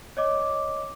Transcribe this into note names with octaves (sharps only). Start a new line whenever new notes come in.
C#5 D#5 D6